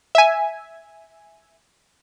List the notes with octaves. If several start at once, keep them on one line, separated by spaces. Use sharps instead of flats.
E5 G#5